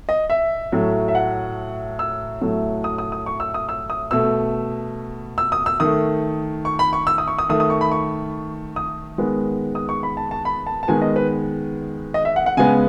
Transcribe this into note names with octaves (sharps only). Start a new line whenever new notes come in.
D#5
E5
A2 F#3 A3
E5
F#5
E6
A2 F#3 A3
D#6
D#6
D#6
C#6
E6
D#6
E6
D#6
B2 A3 E6
E6
D#6
E6
D#3 A3 D#6
C#6
B5
C#6
E6
D#6
C#6
D#6
D#3 A3 D#6
D#6
C#6
B5
C#6
D#6
D#3 G#3 B3
D#6
C#6
B5
A5
A5
B5
A5
A5
D#3 G#3 B3 G#5
D#5
B4
D#5
E5
F#5
F#5
C#3 G#3 B3 G#5